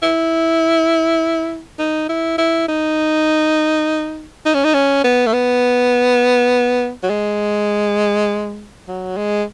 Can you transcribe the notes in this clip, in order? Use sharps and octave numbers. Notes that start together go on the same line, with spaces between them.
E4
D#4
E4
E4
D#4
D#4
C#4
D#4
C#4
B3
A3
B3
F#3
G#3
F#3
G#3